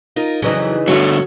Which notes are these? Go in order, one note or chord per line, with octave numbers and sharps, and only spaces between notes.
D#4 F4 A#4
F2 C#3 E3 F#3 D#4
G2 D3 A3 C#4 F#4 C#5